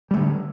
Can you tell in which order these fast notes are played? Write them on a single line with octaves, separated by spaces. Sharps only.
G3 A3 D3